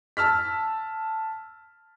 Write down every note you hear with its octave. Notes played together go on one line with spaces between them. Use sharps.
A5 E6 F6 B6